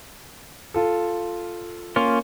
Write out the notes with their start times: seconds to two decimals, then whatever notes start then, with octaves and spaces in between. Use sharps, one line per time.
0.74 F4 A4
1.96 A#3 C#4 F4